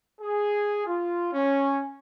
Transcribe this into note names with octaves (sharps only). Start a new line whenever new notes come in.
G#4
F4
C#4